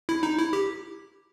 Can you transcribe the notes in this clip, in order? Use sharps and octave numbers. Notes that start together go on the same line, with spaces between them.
E4
D#4
E4
G4